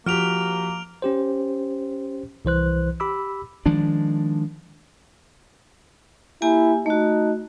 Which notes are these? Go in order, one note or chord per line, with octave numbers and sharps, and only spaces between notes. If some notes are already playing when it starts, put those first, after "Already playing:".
F3 A#3 F#4 G4 F6 D7 F7
C#4 G4 C5
C2 E3 C5 F#6
G4 B5 D6 E6
D#3 F3 G#3 D4
A#3 E4 G4 G#5
A3 D#4 F#4